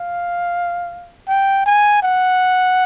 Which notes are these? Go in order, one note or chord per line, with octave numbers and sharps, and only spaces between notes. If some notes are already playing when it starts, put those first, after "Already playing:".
Already playing: F5
G5
G#5
F#5